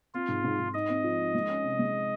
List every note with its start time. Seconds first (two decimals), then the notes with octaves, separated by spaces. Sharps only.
0.14 C4 F4
0.28 G#2
0.45 G#2
0.60 G#2
0.74 D#4 D#5
0.89 C4
1.04 F3
1.19 D#4
1.34 G#3
1.49 C#4
1.64 C3
1.79 G#3